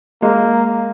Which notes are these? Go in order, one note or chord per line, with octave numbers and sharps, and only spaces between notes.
G#3 A#3